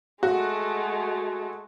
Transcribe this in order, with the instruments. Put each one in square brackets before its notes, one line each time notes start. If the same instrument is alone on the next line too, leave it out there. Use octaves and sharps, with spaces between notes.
[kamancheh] G#3 A3 [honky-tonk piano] F#4